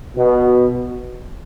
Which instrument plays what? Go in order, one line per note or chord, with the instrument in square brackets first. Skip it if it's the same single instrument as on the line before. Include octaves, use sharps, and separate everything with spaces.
[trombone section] B2